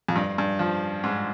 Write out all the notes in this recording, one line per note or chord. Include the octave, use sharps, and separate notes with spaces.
F2
G2
G2
F3
G#2